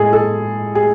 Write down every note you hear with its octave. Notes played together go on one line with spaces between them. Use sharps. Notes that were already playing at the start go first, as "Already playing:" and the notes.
Already playing: A2 G#3 G#4 A4
A4
G#4